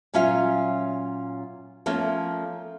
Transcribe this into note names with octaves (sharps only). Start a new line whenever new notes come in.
A#2 F#3 C#4 F4 E5 F5
F3 A3 A#3 C#4